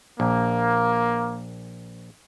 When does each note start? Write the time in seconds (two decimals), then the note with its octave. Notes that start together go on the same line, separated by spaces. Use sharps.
0.20 A#1 A#3